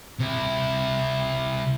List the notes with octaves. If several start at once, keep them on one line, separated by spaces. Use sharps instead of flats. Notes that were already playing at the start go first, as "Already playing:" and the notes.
C3 E4